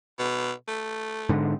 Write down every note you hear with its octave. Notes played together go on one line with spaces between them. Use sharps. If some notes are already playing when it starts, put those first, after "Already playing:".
B2
A3
G#2 D3